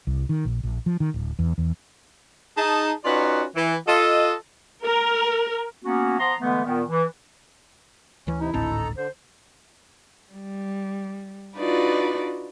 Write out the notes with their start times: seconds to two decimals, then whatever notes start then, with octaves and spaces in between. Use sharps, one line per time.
0.07 C2
0.29 D#3
0.45 A#1
0.63 A#1
0.86 F3
1.00 D#3
1.14 D1
1.39 E2
1.58 E2
2.57 D#4 G#4 A5
3.05 C#4 D#4 F4 F#4 B4 D5
3.55 E3
3.87 F4 A4 D#5
4.84 A#4
5.84 A#3 B3 C#4 F#4
6.19 F3 B3 A#5 C6
6.41 D3 E3 G#3 A3 B3
6.64 A#2 D#3 B3
6.88 E3
8.27 D2 E3 C#4
8.40 C3 D#4 E4
8.54 G#1 D2 A2 C4 D#4 A4 A#5
8.97 D3 C5
10.32 G3
11.56 D4 D#4 F4 F#4 B4 D5